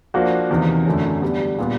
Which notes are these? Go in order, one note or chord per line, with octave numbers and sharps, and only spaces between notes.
F3 A#3 D4 F#4
E2 C3 D#3
F#2 D3 F#3 A3 C#4
G3 B3 D4
A#2 G3 B3 D4